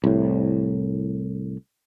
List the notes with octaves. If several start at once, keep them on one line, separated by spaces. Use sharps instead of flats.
C2 A2